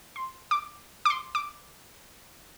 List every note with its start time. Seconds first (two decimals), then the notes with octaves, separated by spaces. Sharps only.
0.16 C6
0.51 D6
1.05 D6
1.10 C6
1.35 D6